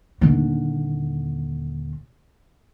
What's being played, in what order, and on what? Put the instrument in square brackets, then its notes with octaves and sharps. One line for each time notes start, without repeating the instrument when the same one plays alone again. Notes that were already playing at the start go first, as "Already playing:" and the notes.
[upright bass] D#1 D3